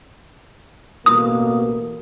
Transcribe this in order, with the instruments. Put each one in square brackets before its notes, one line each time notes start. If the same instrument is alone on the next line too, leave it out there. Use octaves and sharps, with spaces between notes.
[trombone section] A1 B2 A#3 [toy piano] D#6